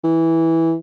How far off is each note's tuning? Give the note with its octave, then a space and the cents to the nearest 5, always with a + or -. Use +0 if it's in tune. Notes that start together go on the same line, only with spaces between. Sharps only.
E3 -10